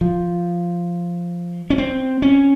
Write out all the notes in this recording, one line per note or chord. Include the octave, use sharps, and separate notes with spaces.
F3
C#4
C4
C#4